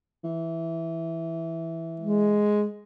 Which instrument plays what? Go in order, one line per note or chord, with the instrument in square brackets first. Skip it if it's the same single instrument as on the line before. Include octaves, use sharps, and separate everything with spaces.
[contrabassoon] E3
[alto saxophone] G#3